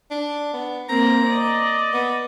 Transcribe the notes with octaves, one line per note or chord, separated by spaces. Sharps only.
D4
B3
A#3 C4 A#5
D5 D#5
B3